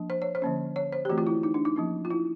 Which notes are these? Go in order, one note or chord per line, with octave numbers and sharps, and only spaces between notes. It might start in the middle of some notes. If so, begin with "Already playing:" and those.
Already playing: F3 A#3 D4
C5
C#5
C5
D3 F3 A#3 C#4
C#5
C5
G4
E3 A3 C4 F#4
F4
E4
D#4
D4
D#4
F3 A#3 C#4
F4
E4